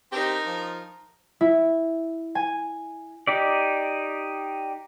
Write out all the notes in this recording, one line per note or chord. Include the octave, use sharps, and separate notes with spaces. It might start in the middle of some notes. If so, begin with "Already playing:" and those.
C4 D#4 G4 A#4
F3
E4
G#5
D#4 G4 D5